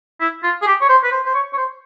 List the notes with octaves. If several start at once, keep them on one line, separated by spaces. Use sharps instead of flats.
E4
F4
G#4
G4
C#5
C5
B4
C5
C5
C#5
C#5
C5